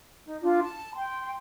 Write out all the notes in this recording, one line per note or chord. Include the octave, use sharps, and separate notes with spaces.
D#4
D4 F4
A5
G5 C6